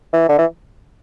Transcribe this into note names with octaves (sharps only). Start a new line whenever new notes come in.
E3
D3
E3